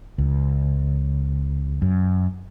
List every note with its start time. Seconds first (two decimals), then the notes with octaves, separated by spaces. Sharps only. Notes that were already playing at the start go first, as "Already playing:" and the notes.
0.18 C#2
1.82 F#2